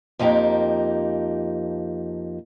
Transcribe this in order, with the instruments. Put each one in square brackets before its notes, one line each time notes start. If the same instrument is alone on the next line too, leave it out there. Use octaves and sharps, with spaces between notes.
[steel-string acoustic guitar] F2 F3 A#3 D#4 G4